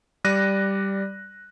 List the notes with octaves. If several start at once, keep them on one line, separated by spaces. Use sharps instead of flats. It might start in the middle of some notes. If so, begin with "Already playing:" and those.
G3 D5 F#6 A#6 D#7